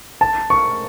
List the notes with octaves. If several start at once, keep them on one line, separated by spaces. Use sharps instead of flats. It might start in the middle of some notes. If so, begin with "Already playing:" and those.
A5
C#6